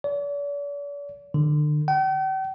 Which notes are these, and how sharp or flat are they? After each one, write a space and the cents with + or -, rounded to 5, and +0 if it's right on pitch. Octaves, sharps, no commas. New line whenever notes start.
D5 -45
D3 +35
G5 -45